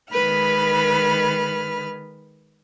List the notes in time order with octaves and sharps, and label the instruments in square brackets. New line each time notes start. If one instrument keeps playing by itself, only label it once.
[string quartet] D#3 G#3 B4 B5 F6